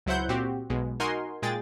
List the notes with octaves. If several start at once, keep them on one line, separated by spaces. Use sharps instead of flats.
C#2 F#3 E4 C5 F#5 G6
A#2 C4 F#4 G4
B1 B2 G#3
D#4 F#4 A#4 G#5 C6
A#2 G#3 G#4 G5 A6